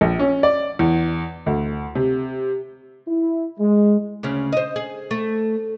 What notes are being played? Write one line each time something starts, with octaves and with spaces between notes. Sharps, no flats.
A#1
C#4
D5
E2
D2
C3
E4
G#3
D2 C#3 C#4
C5 D#5
G#4
A3